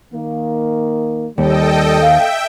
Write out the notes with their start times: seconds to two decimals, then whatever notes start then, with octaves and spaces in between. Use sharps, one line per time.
0.14 D#3 A#3
1.38 D#2 G3 A4 D#5 G5
2.02 E5 F5 G5